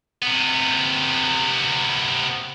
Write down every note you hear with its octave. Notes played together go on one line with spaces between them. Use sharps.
C3 B3